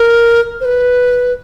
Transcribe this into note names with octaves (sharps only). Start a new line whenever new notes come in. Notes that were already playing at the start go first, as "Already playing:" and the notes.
Already playing: A#4
C5
B4